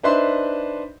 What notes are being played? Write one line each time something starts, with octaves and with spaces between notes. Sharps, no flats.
D4 D#4 B4 C5 E5 C6